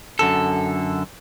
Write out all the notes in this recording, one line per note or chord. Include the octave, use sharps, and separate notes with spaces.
F#2 D3 A4